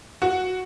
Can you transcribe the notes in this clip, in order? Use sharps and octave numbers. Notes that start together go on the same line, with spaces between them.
F#4